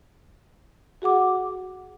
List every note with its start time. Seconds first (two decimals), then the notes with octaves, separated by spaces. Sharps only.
1.02 F#4 G#4 F#5 D6